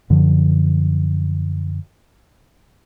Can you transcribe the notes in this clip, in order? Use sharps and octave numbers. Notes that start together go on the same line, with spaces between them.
F#2 D3 F3